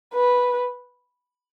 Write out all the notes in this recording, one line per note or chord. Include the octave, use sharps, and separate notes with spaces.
B4